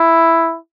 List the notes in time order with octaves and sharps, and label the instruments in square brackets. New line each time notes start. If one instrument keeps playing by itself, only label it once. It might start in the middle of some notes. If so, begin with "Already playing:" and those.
Already playing: [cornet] E4